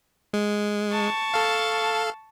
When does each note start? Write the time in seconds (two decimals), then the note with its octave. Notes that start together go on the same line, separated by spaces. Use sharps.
0.34 G#3
0.91 A5 C#6
1.34 A4 F5